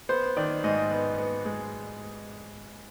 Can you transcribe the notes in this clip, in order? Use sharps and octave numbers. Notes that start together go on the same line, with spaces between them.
B3 C5
D#3 D5
G#2 D#5
B3
B3
G#3